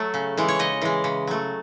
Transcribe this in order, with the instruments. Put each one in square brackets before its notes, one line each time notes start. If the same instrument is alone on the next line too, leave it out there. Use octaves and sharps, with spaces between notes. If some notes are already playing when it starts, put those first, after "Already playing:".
Already playing: [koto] F#3 A3 C#5
C#3
E3 G#3
C#5
C#3 D#5
E3 G#3
C#3
F#3 A3